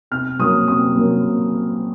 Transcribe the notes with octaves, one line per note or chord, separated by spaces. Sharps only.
C3 F6
F#3 A#3 C#4 D#6
C3 D#6
F#3 A#3 C#4